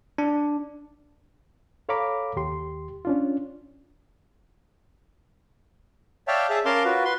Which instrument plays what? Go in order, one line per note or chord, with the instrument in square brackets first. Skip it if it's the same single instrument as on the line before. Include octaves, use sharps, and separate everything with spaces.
[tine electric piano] D4
[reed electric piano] A4 C#5 F5 A#5 B5 D6
D#2 G4 C6
C#4 D4 F4
[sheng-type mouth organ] C#5 D5 E5 F5 G5 A5
G#4 E5 A5
C#4 A#4 F5 A5 C6 D6
F4 F#4 B4
B4 C6